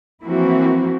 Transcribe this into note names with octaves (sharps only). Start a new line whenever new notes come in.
E3 F3 A#3 C4 E4 F#4